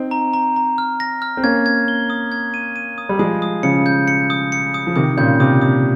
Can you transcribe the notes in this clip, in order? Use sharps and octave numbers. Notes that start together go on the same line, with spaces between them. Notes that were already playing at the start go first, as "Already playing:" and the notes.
Already playing: C4 D#4
A#5
A#5
A#5
F6
A#6
F6
C4
A#3 C#4 G#6
G#6
G7
D#6
G#6
D#7
D#7
D#6
G3
F3 G#3 D#6
D#6
C#3 F3 C#7
G6
C#7
D#6
C#7
D#6
F3
C3 D#3 D#6
A#2 C#3 G6
C3 D#6
C3 D#6